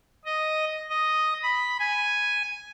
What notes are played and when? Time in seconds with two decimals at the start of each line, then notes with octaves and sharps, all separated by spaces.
0.25 D#5
0.90 D#5
1.43 B5
1.80 G#5